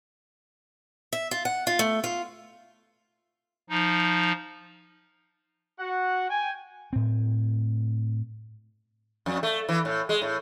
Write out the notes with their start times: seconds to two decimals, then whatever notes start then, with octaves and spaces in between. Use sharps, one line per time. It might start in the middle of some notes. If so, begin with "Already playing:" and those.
1.13 E5
1.31 F4
1.45 F#5
1.67 F4
1.79 A3
2.04 F4
3.69 F3 D#4
5.79 F#4 F#5
6.29 G5 G#5
6.93 A2 C4
9.26 F2
9.43 A3
9.69 E3
9.85 A2
10.09 G#3
10.22 A2